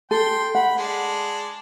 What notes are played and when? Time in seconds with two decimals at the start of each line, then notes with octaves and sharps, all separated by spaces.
0.11 A4 G5 C6
0.55 F#5 B5
0.77 G#3 D4